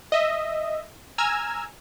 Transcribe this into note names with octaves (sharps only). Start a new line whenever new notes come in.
D#5 E5
G#5 A#5 E6 F6 G#6